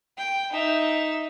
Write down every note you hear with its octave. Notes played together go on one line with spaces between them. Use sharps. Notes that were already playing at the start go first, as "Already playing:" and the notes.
G5
D#4 E5